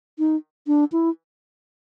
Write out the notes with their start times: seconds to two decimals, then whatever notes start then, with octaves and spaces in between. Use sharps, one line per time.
0.19 D#4
0.67 D4
0.92 E4